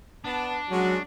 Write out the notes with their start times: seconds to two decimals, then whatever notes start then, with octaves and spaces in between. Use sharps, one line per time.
0.25 B3 D4 A5
0.70 F#3 G#3 C#4 F#4